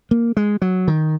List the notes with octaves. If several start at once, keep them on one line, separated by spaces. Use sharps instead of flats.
A#3
G#3
F#3
D#3